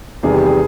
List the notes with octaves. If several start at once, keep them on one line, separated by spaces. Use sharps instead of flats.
E2 C3 D#3 G3 G#4
G4
G#4